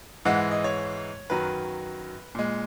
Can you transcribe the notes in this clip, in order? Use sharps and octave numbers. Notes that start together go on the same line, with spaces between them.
G#2 E3 G#3 F#5
D#5
C#5
F#2 D#3 F#3 B4
A#2 G#3